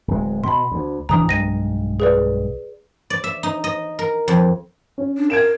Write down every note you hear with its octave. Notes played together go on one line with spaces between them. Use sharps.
D1 G#3
B2 B5 C6
D2
D1 E3 D4 A#5 D#6
B1 G2 G#3 A#6 D#7
G#4 B4 D5
D5
E5
D#4
D#5
A#4
F2
C#4
D4
A#4 G#6 D7 E7